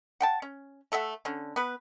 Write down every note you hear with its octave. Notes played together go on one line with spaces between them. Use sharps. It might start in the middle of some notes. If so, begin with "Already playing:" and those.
F#5 G5 A5
C#4
A3 A4 E5 F#5
D3 C#4
B3 B4